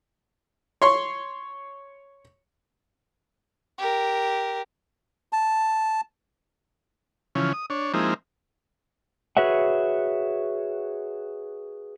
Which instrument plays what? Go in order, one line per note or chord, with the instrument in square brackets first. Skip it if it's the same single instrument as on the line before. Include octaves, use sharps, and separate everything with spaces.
[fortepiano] C#5 C6 C#6
[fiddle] G4 A#4
[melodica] A5
[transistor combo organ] C#3 E3 F3 C#4
D#6
D4 C#5
F3 G#3 A#3 C4 D#4 E4
[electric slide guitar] F#4 G#4 B4 C#5 E5 F#5